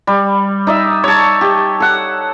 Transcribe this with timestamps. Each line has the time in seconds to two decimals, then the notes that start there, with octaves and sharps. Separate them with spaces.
0.07 G3
0.67 D#4 D5 E5
1.04 C#5 A5
1.41 G4
1.80 A4 F#5